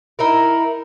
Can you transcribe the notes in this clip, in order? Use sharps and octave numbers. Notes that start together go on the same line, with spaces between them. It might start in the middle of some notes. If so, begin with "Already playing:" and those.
D#4 E4 A#4